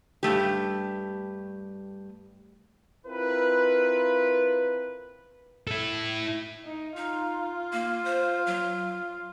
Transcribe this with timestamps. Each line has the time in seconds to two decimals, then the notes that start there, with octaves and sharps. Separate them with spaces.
0.23 G2 C3 A3 G4
3.07 C4 E4 F4 A#4 B4
5.67 E4 A4
6.65 D#4
6.97 D#4 F4
7.72 A#3
8.05 C5
8.46 F#3